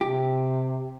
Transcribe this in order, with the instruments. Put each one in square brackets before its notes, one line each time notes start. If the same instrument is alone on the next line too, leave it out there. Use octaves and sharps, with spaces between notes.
[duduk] C3 [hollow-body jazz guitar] G4